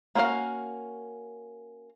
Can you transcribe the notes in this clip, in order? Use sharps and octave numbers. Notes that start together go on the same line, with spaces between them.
A#3 C#4 F#4 B4 F5